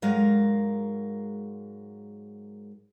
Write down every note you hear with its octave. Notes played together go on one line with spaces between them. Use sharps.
G#2 F#3 G#3 A#4 F5